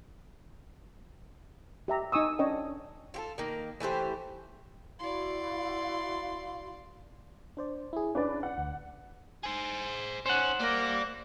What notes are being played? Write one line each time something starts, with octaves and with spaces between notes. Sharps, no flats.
G4 E5 A#5
D#4 G#5 C#6 D#6 E6
C#4 D4 C#5 D#5 G5
F4 G4 A4
D#3 A#3
E3 A3 G4 C5
E4 F#4 D5 F5 C6
D4 C5 D5
E4 G#4
C#4 D4 B4 D5
F#5
D2
G#4 C5
C#4 C5 F#5
G3 A#3 D5